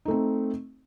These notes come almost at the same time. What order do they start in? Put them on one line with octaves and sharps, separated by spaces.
D#4 A3 C4